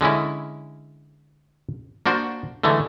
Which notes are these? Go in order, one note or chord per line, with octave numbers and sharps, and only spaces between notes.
D3 G#3 C#4 E4
A#3 D4 F#4 C5
D3 E3 G#3 A3